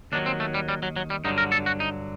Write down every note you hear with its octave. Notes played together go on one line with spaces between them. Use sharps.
D#2 D#3 F#3 D4
C4
A3
G3
G3
F#3
F#3
G3
G2 D3 F#3 D#4
A#4
A4
F#4
D#4